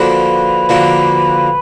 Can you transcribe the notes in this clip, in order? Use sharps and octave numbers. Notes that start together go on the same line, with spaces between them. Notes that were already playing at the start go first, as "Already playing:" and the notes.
Already playing: D3 F3 A#3 D4 F#4 B4
D3 F3 A#3 D4 F#4